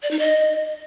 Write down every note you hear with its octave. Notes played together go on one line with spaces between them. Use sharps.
D5
D#4
D#5